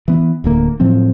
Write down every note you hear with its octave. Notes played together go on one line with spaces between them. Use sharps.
E3 B3
D1 D2 A#3
A2 F3 F#3 C4